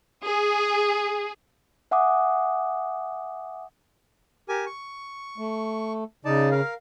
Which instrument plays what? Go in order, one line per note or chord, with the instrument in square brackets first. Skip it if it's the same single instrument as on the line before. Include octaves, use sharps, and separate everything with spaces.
[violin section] G#4
[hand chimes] E5 F#5 G#5 D6 D#6
[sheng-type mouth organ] G4 A#4 G#5
C#6
[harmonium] A3
[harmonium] C#3 [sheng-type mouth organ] D#4 D5 A5
[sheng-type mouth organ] A#4 F5